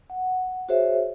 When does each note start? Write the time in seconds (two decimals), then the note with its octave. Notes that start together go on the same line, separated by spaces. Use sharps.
0.10 F#5
0.69 F#4 G#4 C5 C#5 E5